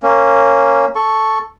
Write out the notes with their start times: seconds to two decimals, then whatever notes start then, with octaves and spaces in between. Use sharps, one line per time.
0.03 A#3 C#4
0.95 A4 C#6